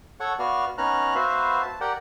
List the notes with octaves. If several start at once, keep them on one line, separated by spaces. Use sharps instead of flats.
A4 C#5 F#5 C#6
B3 F#4 D5 F5 F6
B3 C#4 D#4 A#5 F6 F#6
B3 F#4 B4 C5 E5 F5
A5
G4 A#4 D5 F#5 G5